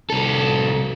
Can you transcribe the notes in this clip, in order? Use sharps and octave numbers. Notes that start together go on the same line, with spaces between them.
C2 A4